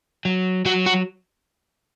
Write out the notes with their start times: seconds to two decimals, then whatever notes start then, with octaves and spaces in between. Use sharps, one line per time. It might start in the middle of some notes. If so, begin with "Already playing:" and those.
0.25 F#3
0.65 F#3 F#4
0.86 F#4